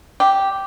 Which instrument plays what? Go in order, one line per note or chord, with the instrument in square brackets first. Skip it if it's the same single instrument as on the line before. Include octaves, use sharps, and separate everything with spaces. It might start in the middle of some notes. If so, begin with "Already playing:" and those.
[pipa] G4